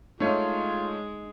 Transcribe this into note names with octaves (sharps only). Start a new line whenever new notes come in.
G#3 A3 D#4 F4 C#5